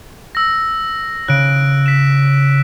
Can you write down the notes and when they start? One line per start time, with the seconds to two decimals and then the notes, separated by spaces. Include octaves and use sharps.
0.35 E6 A#6
1.28 C#3 F#6 D7
1.86 B6 E7